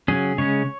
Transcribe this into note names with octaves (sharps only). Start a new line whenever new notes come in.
C#3 F#3 C#4 G#4
C#3 G#3 C#4 C#5